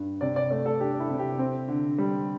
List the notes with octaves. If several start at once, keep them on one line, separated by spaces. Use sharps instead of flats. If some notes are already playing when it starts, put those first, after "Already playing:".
Already playing: G2
C3 D5
D5
A3 D5
A4
D4 G4
E4
C3
G4
C4
D3
G3